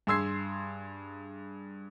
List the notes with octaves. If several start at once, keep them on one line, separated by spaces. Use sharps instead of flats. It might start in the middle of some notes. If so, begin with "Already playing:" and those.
G2 G#4 C6 E6 G#6 C7